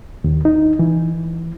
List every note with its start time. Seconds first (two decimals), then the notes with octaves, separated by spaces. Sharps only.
0.24 D#2
0.45 D#4
0.79 E3